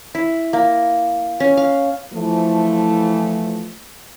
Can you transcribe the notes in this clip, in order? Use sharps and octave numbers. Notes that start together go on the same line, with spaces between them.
E4
A#3
C#4
F5
E3 F3 A3